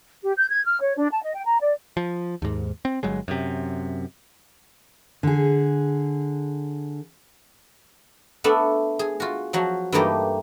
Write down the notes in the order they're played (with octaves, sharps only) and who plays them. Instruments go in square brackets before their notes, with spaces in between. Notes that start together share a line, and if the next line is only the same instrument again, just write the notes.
[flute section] G4
G6
G#6
F6
C#5
D4
A5
D#5
G5
A#5
D5
[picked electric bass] F3
D#2 G#2
C4
G1 F#3 G#3
F#2 C3
[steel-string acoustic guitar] D3 G#4
[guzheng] A3 B3 D4 A4
G#4
F4 F#4
F3 F#3 F#4
G2 E3 A3 A#3 D#4 G4